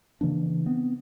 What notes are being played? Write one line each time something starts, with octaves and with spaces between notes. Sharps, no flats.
C#3 E3 A#3 D4
B3 C4